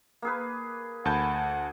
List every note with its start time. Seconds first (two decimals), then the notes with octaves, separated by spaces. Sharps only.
0.22 A#3 G#4 B4
1.05 D2 F#5 G#5 A5 B5 G6